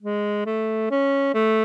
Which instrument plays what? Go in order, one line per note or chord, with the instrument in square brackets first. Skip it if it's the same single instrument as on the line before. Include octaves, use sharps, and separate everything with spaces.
[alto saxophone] G#3
A3
C#4
A3